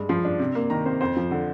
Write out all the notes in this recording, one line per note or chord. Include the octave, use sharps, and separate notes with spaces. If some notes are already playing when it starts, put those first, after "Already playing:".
Already playing: G2 G#3
F3 C6
D4
C3
A#3
D#3 A#5
C3 C5
F2 C5
F3
D3